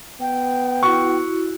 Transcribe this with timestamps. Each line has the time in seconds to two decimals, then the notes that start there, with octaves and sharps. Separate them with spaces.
0.21 B3 G5
0.83 E4 F#4 C#6